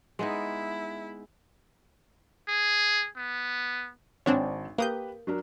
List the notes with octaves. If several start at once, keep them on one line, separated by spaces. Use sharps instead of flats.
G#3 B3 D#4 E4
G#4
B3
G#1 C4 D4 C#5 G#5 A5
A#3 G4 B4 D#6 G6
F#3 D4 A#4